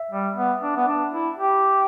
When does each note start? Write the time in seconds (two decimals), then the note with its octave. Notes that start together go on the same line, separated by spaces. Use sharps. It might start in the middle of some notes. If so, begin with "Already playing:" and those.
Already playing: E5
0.11 G3
0.36 B3
0.62 D4
0.76 B3
0.88 D4
1.12 E4
1.37 G4